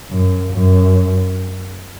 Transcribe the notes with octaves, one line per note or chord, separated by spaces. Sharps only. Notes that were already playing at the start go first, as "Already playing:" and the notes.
F#2
F#2